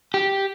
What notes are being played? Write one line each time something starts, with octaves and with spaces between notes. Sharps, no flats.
G4